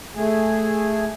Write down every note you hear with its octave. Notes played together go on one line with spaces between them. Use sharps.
A3 G#4